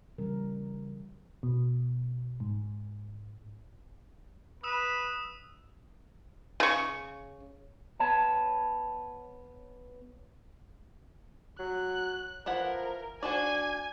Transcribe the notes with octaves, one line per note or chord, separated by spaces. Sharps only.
C#3 E3 G3 C#4 A#4
B2
G#2
B4 D#6 E6 E7
C#3 C#6
B3 C#5 A5
F#3 F#6
E3 F3 E4 A#4 F#5
D4 F#4 C5 D5 G#5 G#6